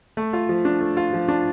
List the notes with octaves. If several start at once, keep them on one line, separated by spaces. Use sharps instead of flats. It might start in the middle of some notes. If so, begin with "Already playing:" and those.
A3
F4
F3
D4
A3
F4
F3
D4